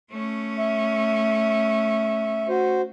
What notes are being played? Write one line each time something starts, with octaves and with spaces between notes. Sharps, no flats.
A3 C#4
E5
F#4 C5